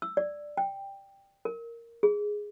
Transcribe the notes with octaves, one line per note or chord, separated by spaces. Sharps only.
E6
D5
G5
A#4
G#4